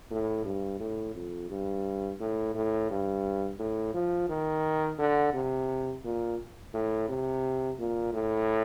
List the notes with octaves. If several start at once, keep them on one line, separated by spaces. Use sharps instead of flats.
A2
G2
A2
F2
G2
A2
A2
G2
A2
F3
D#3
D3
C3
A#2
A2
C3
A#2
A2